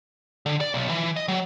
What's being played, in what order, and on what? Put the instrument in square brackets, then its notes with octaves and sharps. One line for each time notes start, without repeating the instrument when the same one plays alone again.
[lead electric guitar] D3
D5
B1
E3
D#5
F#3